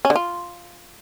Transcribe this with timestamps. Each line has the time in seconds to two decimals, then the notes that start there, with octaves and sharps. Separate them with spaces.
0.05 C#4
0.10 D3
0.16 F4